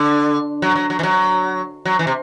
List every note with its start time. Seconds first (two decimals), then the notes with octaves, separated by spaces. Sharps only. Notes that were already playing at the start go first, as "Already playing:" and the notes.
Already playing: D3
0.62 F#3
0.76 F#3
0.90 F#3
0.99 E3
1.03 F#3
1.85 F#3
1.99 E3
2.07 C3